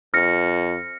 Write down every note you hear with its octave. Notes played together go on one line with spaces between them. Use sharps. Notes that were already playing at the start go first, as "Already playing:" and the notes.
F2 F6 A#6 C#7